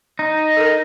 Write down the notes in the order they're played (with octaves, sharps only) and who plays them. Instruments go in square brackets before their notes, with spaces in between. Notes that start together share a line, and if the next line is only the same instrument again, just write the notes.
[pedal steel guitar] D#4
[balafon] A4 A#4